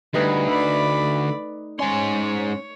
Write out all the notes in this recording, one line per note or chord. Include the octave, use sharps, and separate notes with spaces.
D2 G3 A3 D#4 B4 B5
D3 D5 B5
G#2 C#4 C#5 C6